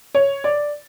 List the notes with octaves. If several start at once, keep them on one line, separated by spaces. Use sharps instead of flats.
C#5
D5